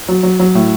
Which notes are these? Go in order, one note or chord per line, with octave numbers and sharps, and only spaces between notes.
F#3
F#3
F#3
A2